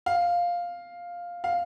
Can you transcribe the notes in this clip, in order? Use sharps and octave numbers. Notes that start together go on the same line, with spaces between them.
F5
F5